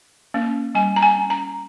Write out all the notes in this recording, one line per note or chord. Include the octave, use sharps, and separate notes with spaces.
A#3 C#4
G3 G#5
A#5
G#5
C#4
A#5